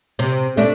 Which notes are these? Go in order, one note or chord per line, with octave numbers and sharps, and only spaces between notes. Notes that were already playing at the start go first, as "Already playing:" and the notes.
C3
A3 D4